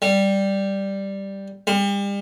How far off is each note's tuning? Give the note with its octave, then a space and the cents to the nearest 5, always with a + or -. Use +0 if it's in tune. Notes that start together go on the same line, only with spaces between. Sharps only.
G3 +0
G3 +35